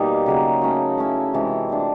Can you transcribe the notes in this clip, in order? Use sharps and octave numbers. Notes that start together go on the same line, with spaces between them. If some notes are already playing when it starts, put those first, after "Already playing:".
Already playing: B2 G3 A#3 D#4 G4
C#3 F#3 A#3
A3 C#4 F#4
A3 C#4 E4
C3 E3 G#3
A3 D4 F4